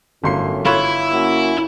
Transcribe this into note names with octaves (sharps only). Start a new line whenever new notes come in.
G1 F#2 A2 C6 C7
E4 F4 B4 C#5
A#3 C#4 F#4